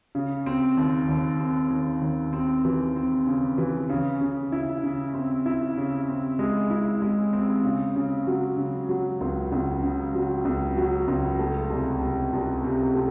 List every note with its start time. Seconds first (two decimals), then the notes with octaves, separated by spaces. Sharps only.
0.15 C#3
0.46 C4
0.77 D#2
1.09 D#2
1.40 C4
1.71 D#2
2.02 D#2
2.33 C4
2.65 E3
2.96 C4
3.27 C#3
3.58 E3
3.89 C#3
4.21 C#3
4.52 E4
4.83 C#3
5.14 C4
5.46 E4
5.77 C#3
6.08 C4
6.39 G#3
6.70 E4
7.02 G#3
7.33 C4
7.64 C#3
7.96 C#3
8.27 F#3
8.58 C#3
8.89 F#3
9.21 C#2
9.52 C#2
9.82 C#3
10.14 F#3
10.45 C#2
10.77 F#3
11.08 C#2
11.39 A3
11.70 C2
12.01 C2
12.33 C2
12.64 C3
12.95 A3